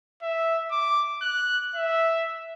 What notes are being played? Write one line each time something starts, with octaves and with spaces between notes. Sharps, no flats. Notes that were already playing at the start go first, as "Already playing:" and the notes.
E5
D6
F#6
E5